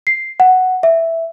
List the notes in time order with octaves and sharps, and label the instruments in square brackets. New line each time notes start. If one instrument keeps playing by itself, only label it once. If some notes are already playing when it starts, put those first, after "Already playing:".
[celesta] C7
F#5
E5